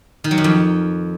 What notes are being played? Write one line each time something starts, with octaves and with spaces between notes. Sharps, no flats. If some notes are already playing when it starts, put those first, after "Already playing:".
D#3
F#3
F#2
F2